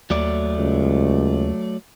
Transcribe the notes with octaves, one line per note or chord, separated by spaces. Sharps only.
D#2 F#3 A3 D5
C#2